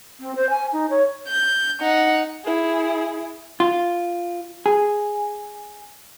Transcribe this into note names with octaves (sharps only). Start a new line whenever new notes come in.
C4
C5
G#5
D#4
C#5
G6
D#4 F#5
E4 G#4
F4
G#4